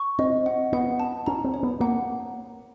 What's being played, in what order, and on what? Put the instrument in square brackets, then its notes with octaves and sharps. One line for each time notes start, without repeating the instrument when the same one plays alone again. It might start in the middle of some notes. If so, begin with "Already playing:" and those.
Already playing: [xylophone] C#6
[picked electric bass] C4 [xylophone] D#5
[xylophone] F#5
[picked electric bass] B3 [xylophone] F#5
[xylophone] A5
[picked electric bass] C#4 [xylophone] A#5
[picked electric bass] C4
[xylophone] C#5
[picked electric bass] B3
[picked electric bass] A#3 [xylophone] F#5